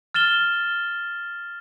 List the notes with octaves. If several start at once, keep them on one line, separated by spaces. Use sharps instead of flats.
F6 A6 E7 G7